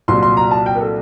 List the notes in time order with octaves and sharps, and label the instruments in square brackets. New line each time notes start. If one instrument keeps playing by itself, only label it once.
[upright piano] C2 A#2 F#3 C6
C6
A#5
A5
G5
A#4
A4